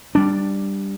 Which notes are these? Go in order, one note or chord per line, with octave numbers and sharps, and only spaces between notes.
G3 D4